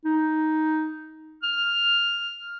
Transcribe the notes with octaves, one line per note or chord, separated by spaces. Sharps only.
D#4
F6